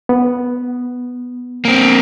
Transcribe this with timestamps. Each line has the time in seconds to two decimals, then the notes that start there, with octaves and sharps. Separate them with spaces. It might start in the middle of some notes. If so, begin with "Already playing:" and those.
0.09 B3
1.65 A#3 C4